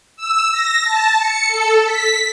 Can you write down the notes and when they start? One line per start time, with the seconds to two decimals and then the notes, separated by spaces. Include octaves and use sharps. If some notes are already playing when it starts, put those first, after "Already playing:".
0.16 E6
0.52 A#6
0.82 A5
1.18 C#7
1.47 A4
1.85 B6